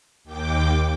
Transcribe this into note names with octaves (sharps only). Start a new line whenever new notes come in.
D#2 G5 D6